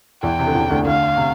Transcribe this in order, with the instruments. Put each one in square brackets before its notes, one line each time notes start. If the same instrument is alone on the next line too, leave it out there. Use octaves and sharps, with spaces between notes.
[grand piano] E2 E3 [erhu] G5
[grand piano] C3
D3
E2 E3
D2 D3
[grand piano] D2 D3 [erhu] F5
[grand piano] C3